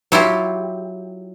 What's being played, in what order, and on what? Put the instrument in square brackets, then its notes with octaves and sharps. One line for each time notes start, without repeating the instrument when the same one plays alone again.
[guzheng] F#3 E4 F4 G4